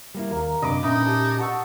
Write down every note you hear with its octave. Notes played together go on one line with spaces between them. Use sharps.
G3 A#3 E4
D#2 A#3
F#2 C3 D4 D#5 B5 D6
A#2 C#4 D#4 E5 B5
G4 A5
F#5 A5 C#6 E6